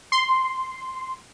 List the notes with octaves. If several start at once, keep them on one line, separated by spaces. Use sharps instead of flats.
C6